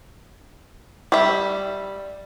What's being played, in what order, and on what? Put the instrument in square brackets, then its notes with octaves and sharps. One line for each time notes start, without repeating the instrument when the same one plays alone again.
[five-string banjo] G3 E5